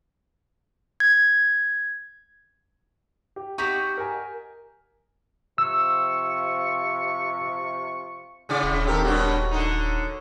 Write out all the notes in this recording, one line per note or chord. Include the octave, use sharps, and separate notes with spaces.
G#6
G4
D#4 F#4 G4 C#6 B6
A#4 G#5
C3 F3 C#6 E6
A2 C#3 G#4 D5
D#1
D#3 C4 G4 A4 A#4
G2 B2 D4 F#4 C#5
D3 D#4